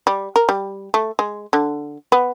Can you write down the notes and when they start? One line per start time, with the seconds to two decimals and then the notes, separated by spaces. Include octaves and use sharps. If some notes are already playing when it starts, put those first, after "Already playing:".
0.07 G3
0.36 A#4
0.49 G3
0.94 A3
1.19 G#3
1.53 D3
2.12 B3